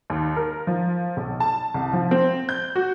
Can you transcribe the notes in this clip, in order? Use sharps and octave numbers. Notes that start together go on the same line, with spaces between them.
D#2
A#4
F3
B1
A5
C2
F3
C4
G6
F#4